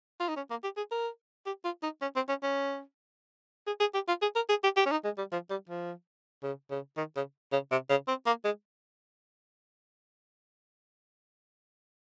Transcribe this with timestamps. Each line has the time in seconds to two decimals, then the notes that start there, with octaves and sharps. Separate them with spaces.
0.20 F4
0.28 D#4
0.36 C#4
0.50 A#3
0.63 G4
0.77 G#4
0.91 A#4
1.46 G4
1.64 F4
1.83 D#4
2.02 C#4
2.16 C4
2.29 C#4
2.43 C#4
3.67 G#4
3.80 G#4
3.94 G4
4.08 F4
4.22 G#4
4.35 A#4
4.49 G#4
4.63 G4
4.77 G4
4.86 C#4
4.91 D#4
5.04 G#3
5.18 G3
5.32 F3
5.50 G3
5.69 F3
6.43 C#3
6.71 C#3
6.97 D#3
7.16 C#3
7.52 C#3
7.71 C3
7.89 C#3
8.08 C4
8.26 A#3
8.45 G#3